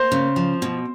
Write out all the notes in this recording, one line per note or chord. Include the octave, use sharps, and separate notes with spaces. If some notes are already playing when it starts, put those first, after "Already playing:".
Already playing: A#3 C5
C#3
F3
B2